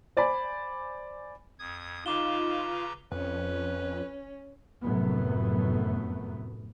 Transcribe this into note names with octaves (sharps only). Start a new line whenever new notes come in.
C5 D5 G#5 B5
F2 D#6 G#6
C#3 D#4 F4 B4 A#5 D6 E7 G7
F2 C#4 B4
F1 F#2 A2 F#3 A3 B3